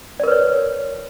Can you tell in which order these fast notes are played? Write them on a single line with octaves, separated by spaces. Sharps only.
D5 A#4 B4 C#5